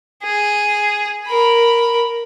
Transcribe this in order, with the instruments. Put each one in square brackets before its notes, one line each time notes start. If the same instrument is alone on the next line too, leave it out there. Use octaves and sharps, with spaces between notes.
[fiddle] G#4
A#4 B5